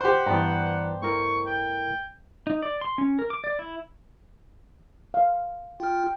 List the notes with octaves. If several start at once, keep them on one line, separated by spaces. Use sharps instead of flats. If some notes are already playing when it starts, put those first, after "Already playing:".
G4 C5 F#5
G2 E3 B3 D5 A#5
A3 E4 A#4 C#6
G5
D#4
D5
C6
C#4
A#4
D6
D5
E4
F5
F4 G5 F6